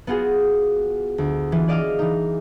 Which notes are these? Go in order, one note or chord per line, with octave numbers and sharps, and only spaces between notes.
B3 F4 F#4 G#4
D2
E3 F4
G#4 D5 D#5 F5
E3 D#4